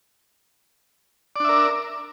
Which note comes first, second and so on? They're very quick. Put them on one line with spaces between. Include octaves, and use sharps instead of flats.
D5 D4 E5 A#4